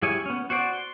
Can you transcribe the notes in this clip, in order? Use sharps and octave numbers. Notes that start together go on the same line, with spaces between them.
G3 E4 G#4 C#5 G#5
B3 C#4
F#4 C5 D5
C6